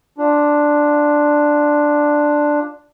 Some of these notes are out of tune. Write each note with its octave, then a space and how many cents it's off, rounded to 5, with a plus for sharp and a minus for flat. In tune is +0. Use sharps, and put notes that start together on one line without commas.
D4 +5 F4 +0